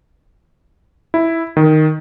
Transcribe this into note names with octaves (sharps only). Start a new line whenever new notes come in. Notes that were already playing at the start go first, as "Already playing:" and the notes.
E4
D#3